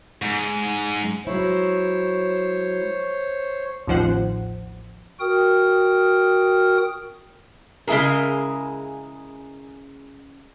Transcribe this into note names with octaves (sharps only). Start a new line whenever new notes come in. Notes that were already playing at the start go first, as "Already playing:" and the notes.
G#2
F#3 G#3 E4 C5 C#5
A1 D#2 F3 C5 F#5
F#4 A#4 G5 D#6 F6
C#3 G#3 E4 G#4 A#4